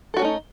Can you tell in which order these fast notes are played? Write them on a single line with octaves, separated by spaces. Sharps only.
A4 F#4 C#4 A3 D#4